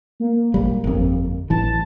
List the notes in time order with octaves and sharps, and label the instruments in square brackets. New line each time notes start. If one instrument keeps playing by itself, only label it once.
[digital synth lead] A#3
[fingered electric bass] A#1 G3
G1 F2
[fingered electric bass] A1 E3 [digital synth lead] A5